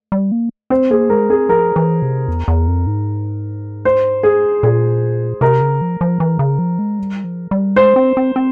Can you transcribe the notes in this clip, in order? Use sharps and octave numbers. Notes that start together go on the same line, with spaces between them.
G3
A#3
C4 C5
A#3 G#4
G#3 A#4
C4 G#4
F3 A#4
E3
C3
E2
E2
F2
G#2
C5
G#4
A#2 G#4
C3 A#4
C#3
F3
F3
E3
C#3
F3
G#3
G3
F3
G3
G#3 C5
C4
C4
C4